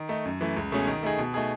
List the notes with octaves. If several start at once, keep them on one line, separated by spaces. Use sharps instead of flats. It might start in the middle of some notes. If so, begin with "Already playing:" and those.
Already playing: D#3
A3 D#4
F#2
E3 A3
C#2
B2 A3 C#4 G#4
D#3
A3 D#4 G#4
B2
A3 D#4 G#4